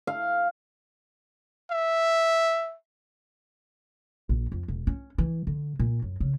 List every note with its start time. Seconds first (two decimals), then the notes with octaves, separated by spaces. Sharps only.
0.07 F5
1.71 E5
4.29 A#1
4.52 F2
4.68 E1
4.87 C#4
5.18 E3
5.47 D3
5.79 A#2
6.02 F#2
6.20 C#3